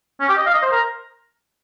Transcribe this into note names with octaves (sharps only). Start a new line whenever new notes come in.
C#4
G4
D#5
F5
D#5
C5
A#4